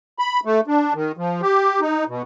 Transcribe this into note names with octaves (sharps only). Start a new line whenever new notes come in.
B5
A3
D4
D#3
F3
G4
D#4
B2